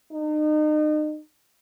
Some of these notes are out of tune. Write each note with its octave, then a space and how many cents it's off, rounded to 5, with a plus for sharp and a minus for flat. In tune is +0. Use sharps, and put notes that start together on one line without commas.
D#4 -35